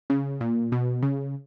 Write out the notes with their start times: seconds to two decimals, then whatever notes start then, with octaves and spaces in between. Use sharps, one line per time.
0.10 C#3
0.41 A#2
0.72 B2
1.03 C#3